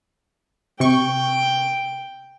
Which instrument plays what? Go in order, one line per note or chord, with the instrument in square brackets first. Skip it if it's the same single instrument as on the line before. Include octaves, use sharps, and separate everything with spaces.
[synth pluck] C3 C#6 [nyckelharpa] G5